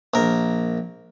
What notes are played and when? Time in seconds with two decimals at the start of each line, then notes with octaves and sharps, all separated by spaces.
0.14 A#1 A#4